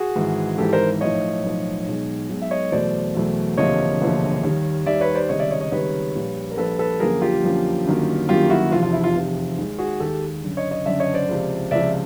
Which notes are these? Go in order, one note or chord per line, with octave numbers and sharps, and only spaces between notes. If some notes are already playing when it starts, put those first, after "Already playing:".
Already playing: F#4 G#4
G#1 G#2 E3
G#1 G#2 E3 G4 A4
A#4 C5
B1 A2 F3 C#5 D#5
B1 A2 F3
B1 B2 G#3
B1 B2 G#3
E5
C#5 D#5
E2 B2 F#3 A3 C5 D5
E2 B2 F#3 A3
E1 D2 C3 F3 A#3 C#5 D#5
E1 D2 C3 F3 A#3
D#2 D#3 G3
D#2 D#3 G3 D5 E5
B4 C#5
C5 D5
C#2 C3 D#3 G3 C#5 D#5
D5 E5
C#5 D#5
C#5 D#5
C#2 C3 D#3 G3 B4 C#5
A#1 A#2 G3
A#4
A#1 A#2 G3 A4 B4
A4 B4
F#2 D3 F3 A#3 G#4 A#4
F4 G4
F#2 D3 F3 A#3
G1 F#2 D#3 F#3 A#3
G1 F#2 D#3 F#3 A#3 F4 G4
E4 F#4
F1 E2 C3 F3 F4
F4
E4
F4
F1 E2 C3 F3
D#2 D#3 G#3
F#4 G#4
D#2 D#3 G#3 G4 A4
F#1 F#2 D3
C#5 D#5
C#5 D#5
F#1 F#2 D3 D5 E5
C#5 D#5
C5 D5
C#2 C3 F3
C#2 C3 F3 D5 E5